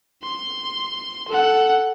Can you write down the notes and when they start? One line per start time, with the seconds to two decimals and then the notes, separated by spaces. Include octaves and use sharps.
0.23 C6
1.28 A4 F#5